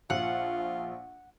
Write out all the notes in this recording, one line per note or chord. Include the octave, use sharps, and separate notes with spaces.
A#1 F4 F#5